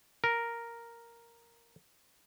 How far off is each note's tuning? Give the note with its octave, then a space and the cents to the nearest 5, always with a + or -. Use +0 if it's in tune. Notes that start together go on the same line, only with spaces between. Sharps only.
A#4 +0